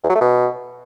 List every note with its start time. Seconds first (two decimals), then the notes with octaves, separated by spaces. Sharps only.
0.04 E2
0.09 F#3
0.15 A3
0.21 B2